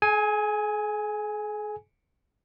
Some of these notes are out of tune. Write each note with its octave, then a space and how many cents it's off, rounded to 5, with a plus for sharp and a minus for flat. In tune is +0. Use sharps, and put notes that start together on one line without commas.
G#4 +40 G#5 +0